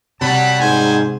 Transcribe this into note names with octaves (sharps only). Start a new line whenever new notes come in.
C3 F#3 G3 F#5 A5 B5
G#2 C5 G#5